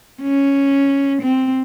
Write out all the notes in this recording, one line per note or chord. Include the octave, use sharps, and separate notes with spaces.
C#4
C4